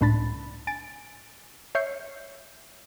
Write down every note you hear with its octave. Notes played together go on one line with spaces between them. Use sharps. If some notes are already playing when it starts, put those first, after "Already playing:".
C#2 A2 D4 B5 A6
G#5 A6 D7
C#5 E5 F6 G6 C7 C#7